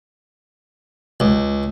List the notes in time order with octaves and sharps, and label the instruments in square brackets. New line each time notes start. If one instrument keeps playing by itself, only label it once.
[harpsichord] C#2